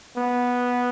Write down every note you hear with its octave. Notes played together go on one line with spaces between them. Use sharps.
B3